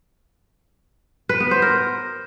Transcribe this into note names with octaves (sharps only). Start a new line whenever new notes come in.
B4
B3
C5
A#4